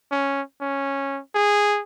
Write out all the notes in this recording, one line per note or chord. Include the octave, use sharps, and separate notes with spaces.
C#4
C#4
G#4